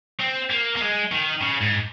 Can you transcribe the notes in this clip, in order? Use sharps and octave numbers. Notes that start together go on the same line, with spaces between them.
C4
A#3
A#3
G#3
D#3
C#3
G#2